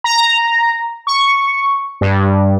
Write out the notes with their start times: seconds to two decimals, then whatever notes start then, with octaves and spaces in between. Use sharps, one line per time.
0.04 A#5
1.07 C#6
2.01 G2